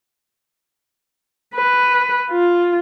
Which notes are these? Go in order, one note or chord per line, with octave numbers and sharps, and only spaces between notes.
B4
F4